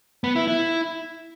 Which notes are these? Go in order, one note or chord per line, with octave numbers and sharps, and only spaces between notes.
B3
E4
E4